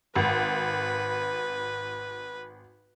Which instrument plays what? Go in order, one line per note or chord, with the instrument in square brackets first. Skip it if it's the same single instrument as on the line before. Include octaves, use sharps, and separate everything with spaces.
[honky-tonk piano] G#1 [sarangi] B4